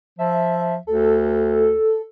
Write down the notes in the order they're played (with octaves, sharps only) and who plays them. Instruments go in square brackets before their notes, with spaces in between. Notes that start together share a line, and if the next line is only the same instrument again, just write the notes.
[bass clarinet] F3 [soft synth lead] E5
[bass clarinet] D2 [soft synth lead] A4